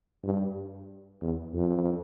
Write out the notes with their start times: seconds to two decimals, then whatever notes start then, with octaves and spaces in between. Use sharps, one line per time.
0.24 G2
1.22 E2
1.54 F2